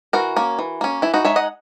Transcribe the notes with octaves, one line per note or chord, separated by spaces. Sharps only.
E3 F#4 A#4
A#3 C#4
E3
A#3 C#4
E3 E4
D#4 F#4
G#3 D#4 C#5 E5
D#5 F#5